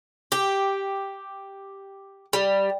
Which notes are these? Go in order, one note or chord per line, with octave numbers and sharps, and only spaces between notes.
G4
G3